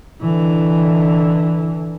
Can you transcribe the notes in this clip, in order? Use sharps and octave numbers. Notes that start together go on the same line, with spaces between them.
D3 E3